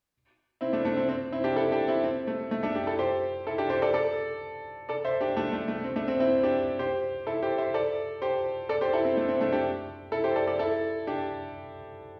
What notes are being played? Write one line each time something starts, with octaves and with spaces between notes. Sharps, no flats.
C4 E4
A3 D4
A3 D4
C4
C4
C4 E4
D4 G4
E4 A4
D4 G4
C4 E4
C4
A3
A3
A3 D4
D4 G4
E4 A4
G4 C5
E4 A4
D4 G4
G4 C5
A4 D5
A4 D5
A4 D5
C5 E5
D4 G4
A3 D4
A3
A3
C4
A3 D4
C4
C4 E4
D4 G4
G4 C5
E4 A4
G4 C5
C5 E5
A4 D5
G4 C5
A4 D5
G4 C5
E4 A4
C4
A3 D4
C4
A3 D4
D4 G4
E4 A4
G4 C5
A4 D5
A4 D5
E4 A4
D4 G4